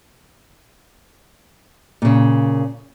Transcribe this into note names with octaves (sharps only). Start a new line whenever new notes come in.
A#2 C#3